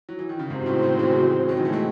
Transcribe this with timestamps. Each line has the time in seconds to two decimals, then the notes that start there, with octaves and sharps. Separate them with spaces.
0.09 F#3
0.19 E3
0.29 D#3
0.39 C#3
0.50 G#2 C3 G#3 C4 F#4 C5
0.66 A2 C#3
0.83 C3 D#3
0.99 C#3 E3
1.48 D#3 F#3
1.57 E3 G#3
1.65 F#3 A3
1.73 G#3 C4